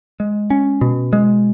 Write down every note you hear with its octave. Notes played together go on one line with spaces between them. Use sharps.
G#3
C#4
B2
G#3